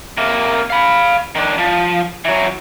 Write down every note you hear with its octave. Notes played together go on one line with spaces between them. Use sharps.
C3 A#3
F5 B5
D#3 D4
F3
E3 F#3